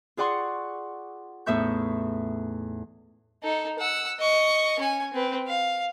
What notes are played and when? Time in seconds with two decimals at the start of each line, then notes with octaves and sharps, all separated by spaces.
0.17 F4 G#4 D5 F#5 C6 C#6
1.46 E2 A2 D#4 E5 C#6 G6
3.43 D#4 A4
3.78 F#5 E6
4.19 D#5 C#6
4.79 C#4 G#5
5.13 C4 B4
5.47 F5